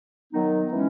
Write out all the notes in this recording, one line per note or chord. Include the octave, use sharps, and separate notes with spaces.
D#3 F#3 B3 D#4
E3 G#3 C#4